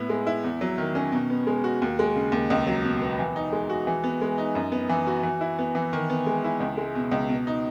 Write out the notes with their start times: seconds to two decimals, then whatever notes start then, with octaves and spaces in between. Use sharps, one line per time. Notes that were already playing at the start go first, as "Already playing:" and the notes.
Already playing: A2 B3 E4
0.09 G#3
0.27 E4
0.44 E2
0.61 F#3
0.78 D#3
0.95 C#4
1.12 B2
1.30 B3
1.47 G#3
1.64 F#4
1.82 D#2
1.99 G#3
2.16 C#3
2.32 D#2
2.50 C#2
2.67 F#3
2.85 B2
3.02 B3
3.19 E3
3.36 D#4
3.52 G#3
3.69 F#4
3.87 E3
4.04 B3
4.21 G#3
4.38 D#4
4.55 F#2
4.72 B3
4.89 E3
5.07 F#4
5.23 E3
5.41 E4
5.59 B3
5.75 E3
5.93 D#3
6.10 B3
6.26 G#3
6.44 E4
6.60 C#2
6.77 G#3
6.95 B2
7.12 C#2
7.29 B2
7.47 D#4